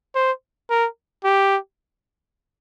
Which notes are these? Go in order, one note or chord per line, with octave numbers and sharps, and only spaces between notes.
C5
A#4
G4